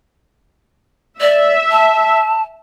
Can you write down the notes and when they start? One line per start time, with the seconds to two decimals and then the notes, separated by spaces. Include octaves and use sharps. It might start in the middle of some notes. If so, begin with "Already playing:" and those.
1.21 D5 E5
1.71 A5